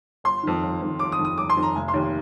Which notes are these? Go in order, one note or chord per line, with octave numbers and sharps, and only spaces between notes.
G1 C6
F2 D#3
G1
F2 D#3
G1 D6
D#6
F2 D#3
D#6
G1 D6
C6
F2 D#3
A#5
F1 G#5
C6
D#2 D#3 A#3